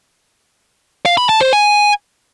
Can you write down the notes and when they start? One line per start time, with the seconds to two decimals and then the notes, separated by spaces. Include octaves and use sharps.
1.06 F5
1.17 B5
1.29 A5
1.41 C5
1.53 G#5